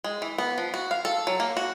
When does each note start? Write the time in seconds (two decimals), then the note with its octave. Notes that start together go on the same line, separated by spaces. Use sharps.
0.04 G#3
0.22 E3
0.38 B3
0.58 F3
0.74 F#4
0.91 F5
1.05 A4
1.27 F#3
1.40 A#3
1.57 F#4